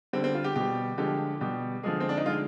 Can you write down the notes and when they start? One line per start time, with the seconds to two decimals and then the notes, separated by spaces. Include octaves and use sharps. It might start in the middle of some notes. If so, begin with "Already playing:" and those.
0.13 D3 G3 C4
0.24 C4
0.35 F4
0.44 G4
0.56 B2 G3 G4
0.98 D3 F3 G#3 G4
1.41 B2 G3 G4
1.83 D3 F3 G#3 G#4
2.00 C4
2.09 D4
2.17 D#4
2.26 D3 G#3 F4